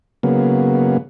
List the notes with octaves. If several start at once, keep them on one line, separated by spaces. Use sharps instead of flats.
C#3 F#3 A#3 B3